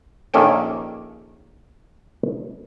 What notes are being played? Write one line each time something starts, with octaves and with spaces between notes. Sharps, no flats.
A#1 D#3 A#3 C#4 A4 G5